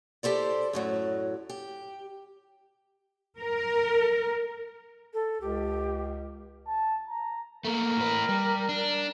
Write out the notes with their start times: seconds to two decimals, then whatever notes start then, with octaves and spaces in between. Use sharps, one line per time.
0.23 E4 G4 A4 C5 D5
0.73 F#2 A2 F#3
1.49 G4
3.40 A#4
5.14 A4
5.41 C#2 G4
6.67 A5
7.09 A#5
7.65 A3 A#3 A#4
7.97 A2 B4
8.29 G3
8.69 D4